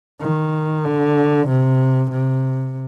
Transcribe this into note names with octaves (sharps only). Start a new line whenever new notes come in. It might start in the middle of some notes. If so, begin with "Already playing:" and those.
D#3
D3
C3
C3